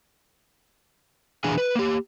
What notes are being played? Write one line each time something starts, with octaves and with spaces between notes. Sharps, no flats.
E2 B2 E3 D4 G#4 G#5
B4
A#3 G4